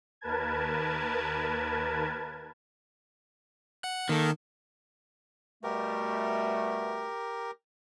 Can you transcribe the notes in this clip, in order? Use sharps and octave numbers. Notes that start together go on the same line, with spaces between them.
D#2 A#4 B4 A5 G#6
F#5 F#6
D#3 A#3 A4
B2 G3 A3 G4 A#4